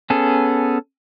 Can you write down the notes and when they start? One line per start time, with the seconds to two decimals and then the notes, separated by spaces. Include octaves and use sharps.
0.10 B3 C#4 G#4 A4